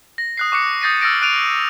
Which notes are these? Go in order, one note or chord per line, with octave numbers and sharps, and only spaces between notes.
A#6
D#6 F#6 C7
C#6 D6 F#6 C#7
D#6 G6 A6 A#6 C7 D#7
E6 F6 A6 A#6 C#7 D7
F#6 D7 D#7 F7